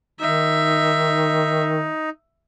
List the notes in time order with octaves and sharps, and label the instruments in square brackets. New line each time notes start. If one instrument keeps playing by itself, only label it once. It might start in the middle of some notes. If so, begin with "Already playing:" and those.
[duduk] D#3 [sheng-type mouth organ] D#4 [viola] E5